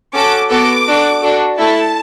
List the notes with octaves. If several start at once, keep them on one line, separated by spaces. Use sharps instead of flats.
C#4 F#4 A4 D6
B3 F#4 A4 D6
D4 F#4 A4
D4 F#4 A4
A3 E4 A4 A5